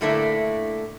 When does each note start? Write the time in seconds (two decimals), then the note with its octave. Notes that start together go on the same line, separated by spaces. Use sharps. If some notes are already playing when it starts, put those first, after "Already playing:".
0.01 A2 D3 A3 A#3 D4 E4